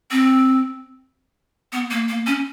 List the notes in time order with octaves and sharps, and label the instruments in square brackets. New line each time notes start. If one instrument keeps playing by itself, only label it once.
[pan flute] C4
B3
A#3
A#3
C#4